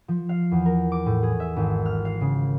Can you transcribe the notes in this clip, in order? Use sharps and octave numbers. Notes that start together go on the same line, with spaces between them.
F3
F5
E2
A#4
D6
A2
G#4
E5
G#1
F6
F5
C#3